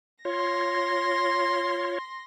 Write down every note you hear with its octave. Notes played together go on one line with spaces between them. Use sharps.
F4 C#5 C6 A#6